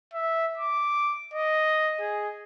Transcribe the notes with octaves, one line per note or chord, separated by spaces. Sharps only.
E5
D6
D#5
G#4